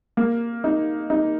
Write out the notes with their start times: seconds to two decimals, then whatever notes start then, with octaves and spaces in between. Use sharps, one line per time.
0.17 A#3
0.64 D#4
1.10 D#4